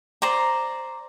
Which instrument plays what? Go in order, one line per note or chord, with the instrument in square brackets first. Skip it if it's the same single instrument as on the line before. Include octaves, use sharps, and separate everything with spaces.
[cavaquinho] C5 D5 A#5